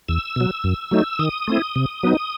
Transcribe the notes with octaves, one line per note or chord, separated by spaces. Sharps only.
E2 E6
B2 F#3
F#2
F#3 A3 D#4
D#3 D#6
A3 C4 E4
C3
F#3 B3 D#4